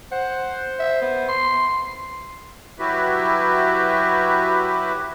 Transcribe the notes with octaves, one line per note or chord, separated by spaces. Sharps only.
C5 F#5
E5
B3
C6
F#3 E4 F#4 G4 B4 E5